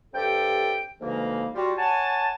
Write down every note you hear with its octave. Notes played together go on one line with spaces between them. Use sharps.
G2 C3 G4 A4 G5
D2 G#2 C#3 E3 A#3
G3 F4 F#4
C#5 F#5 G#5 A5